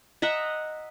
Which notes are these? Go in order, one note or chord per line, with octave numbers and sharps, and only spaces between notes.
D#5 E5 F#5 A#5